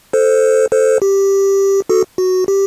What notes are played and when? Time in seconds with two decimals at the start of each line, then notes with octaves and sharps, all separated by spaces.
0.13 A4 C5
0.72 A4 C5
1.02 G4
1.89 F#4 A4
2.18 F#4
2.48 G4